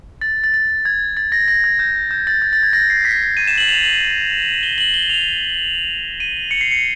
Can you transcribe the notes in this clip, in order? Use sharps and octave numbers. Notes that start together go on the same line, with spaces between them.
A6
A6
A6
G#6
A6
A#6
A#6
G#6
G6
G6
A6
G#6
A6
G#6
A#6
C7
B6
D#7
E7
F#7
F7
F#7
G7
F#7
G7
F7
D#7
C#7
C7
C#7